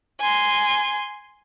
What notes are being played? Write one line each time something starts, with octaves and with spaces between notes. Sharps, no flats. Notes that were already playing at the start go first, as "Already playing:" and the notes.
G#5 C6